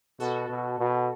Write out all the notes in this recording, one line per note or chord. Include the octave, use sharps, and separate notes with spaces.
B2 F#4 A4
B2
B2